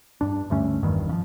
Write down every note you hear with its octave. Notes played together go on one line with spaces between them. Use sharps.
G2 D4
D2 G2 A3 C#4
G#1 E2 G2 D#3
C#3 F3